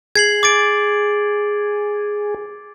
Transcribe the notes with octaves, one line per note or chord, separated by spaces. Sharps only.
G#4 G#6 C7 F#7
D6 A6 D7